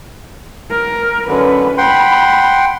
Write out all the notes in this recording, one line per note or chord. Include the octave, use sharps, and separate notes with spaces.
A#4
F#2 D3 C#4 B4
F#5 G5 B5 C6